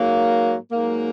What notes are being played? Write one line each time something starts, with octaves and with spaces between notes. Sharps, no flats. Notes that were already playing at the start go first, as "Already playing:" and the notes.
Already playing: G#2 F#3 A#3
G#2 F#3 A#3